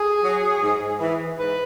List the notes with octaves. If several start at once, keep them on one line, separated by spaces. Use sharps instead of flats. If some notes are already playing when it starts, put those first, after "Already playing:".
Already playing: G#4
F#3
G#2
E3
G#2 B4